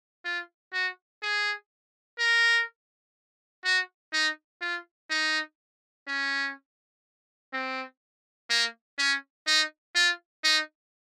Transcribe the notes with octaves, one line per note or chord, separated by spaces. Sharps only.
F4
F#4
G#4
A#4
F#4
D#4
F4
D#4
C#4
C4
A#3
C#4
D#4
F4
D#4